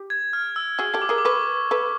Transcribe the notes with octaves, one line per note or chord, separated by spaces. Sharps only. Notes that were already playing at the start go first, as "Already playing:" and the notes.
Already playing: G4
G#6
F6
E6
F#4 G#4 E6
G4 A4
D6
G#4 A#4
D6
A4 B4 C#6
A4 B4